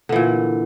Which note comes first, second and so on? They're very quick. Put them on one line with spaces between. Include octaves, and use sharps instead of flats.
D3 E3 A#2